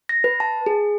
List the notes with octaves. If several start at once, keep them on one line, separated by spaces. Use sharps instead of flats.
A#6
B4
A5
G#4